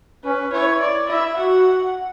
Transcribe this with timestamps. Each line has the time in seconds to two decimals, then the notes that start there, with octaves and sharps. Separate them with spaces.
0.24 C#4 B4
0.52 E4 C#5
0.80 D5
1.09 E4 E5
1.37 F#4 F#5